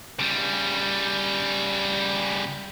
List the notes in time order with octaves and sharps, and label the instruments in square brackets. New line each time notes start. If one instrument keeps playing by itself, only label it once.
[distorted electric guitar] C#3 G3